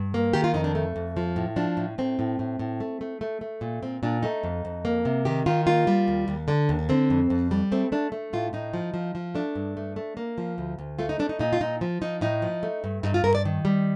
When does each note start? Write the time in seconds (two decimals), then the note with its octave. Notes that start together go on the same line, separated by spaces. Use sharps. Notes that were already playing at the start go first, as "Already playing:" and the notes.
Already playing: G2
0.14 A#3
0.33 D#3 G4
0.44 F4
0.54 F2 D#4
0.64 D4
0.75 A3
0.96 F2
1.17 F3
1.36 A2
1.56 F3 D4
1.77 A2
1.98 A2 C4
2.19 A2
2.39 A2
2.59 A2
2.80 A3
3.01 A3
3.21 A3
3.41 A3
3.61 A#2
3.83 A#2 C4
4.03 A#2 D4
4.23 A3 D#4
4.44 F2
4.65 F2
4.85 A#3
5.05 C3
5.25 D#3 G4
5.46 D#3 F4
5.67 A#3 F4
5.87 G3
6.08 D#2
6.28 D#2
6.48 D3 D4
6.69 D#2
6.89 D3 C4
7.10 F2
7.30 F2
7.51 G3
7.72 A3 C4
7.92 A3 D4
8.12 A3
8.33 A2 F4
8.53 A2 D#4
8.74 F3
8.94 F3
9.15 F3
9.35 A3 D4
9.56 G2
9.77 A3
9.96 A3
10.17 A#3
10.38 F3
10.58 D2
10.79 D2
10.99 A3 F4
11.09 D#4
11.19 A3 D4
11.29 D#4
11.39 A#2 D#4
11.53 F4
11.61 A#2 D#4
11.81 F3
12.02 F3 D#4
12.21 A2 D#4
12.42 F3
12.63 A3
12.84 G2
13.03 G2 D#4
13.14 F4
13.24 G2 A#4
13.35 D5
13.45 D#3
13.65 G3